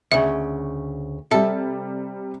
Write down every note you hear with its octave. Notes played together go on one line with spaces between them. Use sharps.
D2 C#3 E5
C3 G3 A4 E5